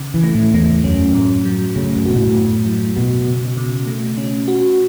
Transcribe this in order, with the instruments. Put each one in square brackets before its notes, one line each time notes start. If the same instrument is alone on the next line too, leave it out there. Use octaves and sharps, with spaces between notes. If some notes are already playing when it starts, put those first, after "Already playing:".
Already playing: [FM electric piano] C#3
[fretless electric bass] E3
[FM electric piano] A3
[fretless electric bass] A2
[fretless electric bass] E2 [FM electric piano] A3
[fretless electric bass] F#2 [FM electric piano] C#4
[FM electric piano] A2
F#3
[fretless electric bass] C#3 [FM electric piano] A3
[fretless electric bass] F#2
[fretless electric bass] B2 [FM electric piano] F#4
[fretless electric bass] A2
[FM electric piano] F#2
F#3
[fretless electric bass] B2 [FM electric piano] F#4
[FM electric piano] C#3
C#3
A3
C#4
F#4